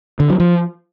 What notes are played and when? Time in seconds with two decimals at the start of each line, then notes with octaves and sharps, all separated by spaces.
0.20 D3
0.30 F#3
0.40 F3